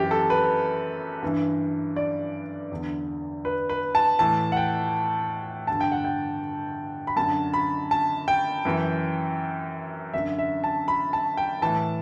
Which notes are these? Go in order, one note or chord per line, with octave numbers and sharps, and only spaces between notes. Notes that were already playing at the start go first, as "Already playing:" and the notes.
Already playing: F#2 E3 G4
A4
B4
G2 E3
D5
E2 D3
B4
B4
A5
A2 E3 A5
F#5
G5
G2 D3 A5
G5
F#5
G5
B5
F#2 D3 A5
B5
A5
G5
F#2 E3
F#2 D3 E5
E5
A5
B5
A5
G5
A2 E3 A5